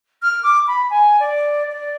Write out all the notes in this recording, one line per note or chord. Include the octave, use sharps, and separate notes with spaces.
F6
D6
B5
G#5
D5
D5